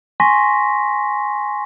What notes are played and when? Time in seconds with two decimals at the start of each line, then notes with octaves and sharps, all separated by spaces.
0.20 G#5 C6 C#6 A#6 B6